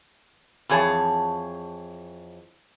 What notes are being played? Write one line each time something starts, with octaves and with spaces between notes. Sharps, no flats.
F2 E3 G#4 C#5 A5